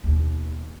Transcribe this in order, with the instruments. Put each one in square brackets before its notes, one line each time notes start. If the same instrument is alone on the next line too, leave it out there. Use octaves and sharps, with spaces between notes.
[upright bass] D#2 B2